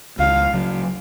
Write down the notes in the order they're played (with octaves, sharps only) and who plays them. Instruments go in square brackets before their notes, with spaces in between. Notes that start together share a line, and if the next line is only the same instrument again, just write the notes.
[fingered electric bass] C#2 [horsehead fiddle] F5
[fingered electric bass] C#3 F#3